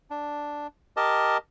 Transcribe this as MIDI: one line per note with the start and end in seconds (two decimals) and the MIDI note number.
0.10 0.67 62
0.97 1.37 67
0.97 1.37 70
0.97 1.37 75
0.97 1.37 81